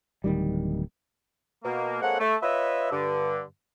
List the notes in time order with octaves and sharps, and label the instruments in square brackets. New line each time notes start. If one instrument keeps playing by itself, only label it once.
[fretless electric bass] D1 D#3 G3
[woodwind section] B2 A#3
G#3 A#3 C4 A4 C#5 F#5
A3
F4 B4 C#5 D#5 E5
G2 D3